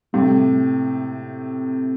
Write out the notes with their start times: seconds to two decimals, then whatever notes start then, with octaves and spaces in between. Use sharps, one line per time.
0.14 A2 C3 G3